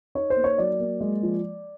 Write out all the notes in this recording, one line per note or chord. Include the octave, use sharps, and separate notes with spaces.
D#4 C#5
C5
A#3
C#5
F#3 D5
A#3
G#3
F3